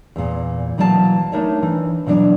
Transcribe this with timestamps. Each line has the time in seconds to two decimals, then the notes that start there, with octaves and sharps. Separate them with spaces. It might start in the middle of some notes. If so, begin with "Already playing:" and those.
0.16 E2 A#2
0.78 B2 E3 F#3 A#3 D#5 A5
1.32 A3 D4 D#4 A#4 C#5 E5
1.63 E3
2.07 B2 E3 F#3 D4